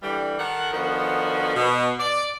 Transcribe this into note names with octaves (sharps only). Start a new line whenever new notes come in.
D3 E3 G3
D#3 A4 A#4 F#5
D3 D#3 F3 B3 F#4
B2
D5